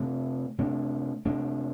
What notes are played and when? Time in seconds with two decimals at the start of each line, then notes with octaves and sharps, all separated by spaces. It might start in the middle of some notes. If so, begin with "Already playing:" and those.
Already playing: C3 A3 D4
0.58 C3 A3 D4
1.25 C3 A3 D4